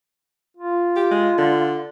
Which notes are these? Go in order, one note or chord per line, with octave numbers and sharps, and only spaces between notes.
F4
G4
G#3
D3